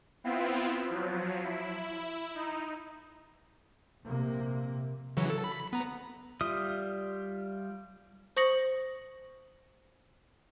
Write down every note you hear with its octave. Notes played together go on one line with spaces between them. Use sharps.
B3 C4 E4 F4
F3 F#3
E4
D#4
A#1 C3 A#3
C#3 E3 F#3
A4
B5
B3 A#5
G3 F4 E5 D#6
C5 C#6 D#6 A#6 C#7 F#7